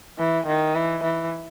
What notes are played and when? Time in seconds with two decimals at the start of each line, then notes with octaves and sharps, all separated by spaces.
0.18 E3
0.46 D#3
0.75 E3
1.03 E3